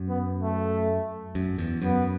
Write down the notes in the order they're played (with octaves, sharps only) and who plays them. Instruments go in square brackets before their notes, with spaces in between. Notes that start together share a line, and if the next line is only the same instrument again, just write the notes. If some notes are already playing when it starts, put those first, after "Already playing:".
Already playing: [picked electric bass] F#2
[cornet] B3
A3
[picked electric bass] F#2
E2
[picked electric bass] F#2 [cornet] B3